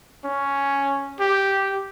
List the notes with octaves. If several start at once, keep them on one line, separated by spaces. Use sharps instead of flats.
C#4
G4